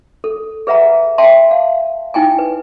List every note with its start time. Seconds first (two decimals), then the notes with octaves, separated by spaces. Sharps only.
0.24 A4
0.67 G#4 B4 E5 F#5 A#5
1.18 E5 G5 A5 C6
1.51 F5
2.14 D#4 E4 G5 G#5
2.39 B4